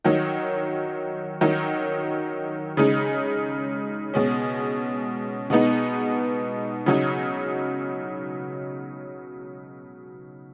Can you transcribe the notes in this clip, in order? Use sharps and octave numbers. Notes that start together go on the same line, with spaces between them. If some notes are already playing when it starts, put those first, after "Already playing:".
D#3 F#3 D#4
D#3 F#3 D#4
C#3 G#3 D#4
B2 G#3 C#4
B2 G#3 B3 D#4
C#3 F#3 D#4